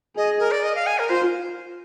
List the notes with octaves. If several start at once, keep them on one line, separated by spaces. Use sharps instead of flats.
G#4 D#5
A#4
D5
D#5
F5
G#5
A#4
F4 C5